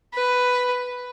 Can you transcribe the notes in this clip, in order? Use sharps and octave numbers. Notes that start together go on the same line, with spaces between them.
B4